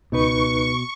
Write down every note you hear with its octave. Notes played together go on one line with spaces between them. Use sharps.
C#2 B2 D#4 B4 C#6